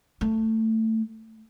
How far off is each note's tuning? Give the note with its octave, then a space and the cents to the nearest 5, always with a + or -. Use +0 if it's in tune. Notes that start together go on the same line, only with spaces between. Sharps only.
A3 +15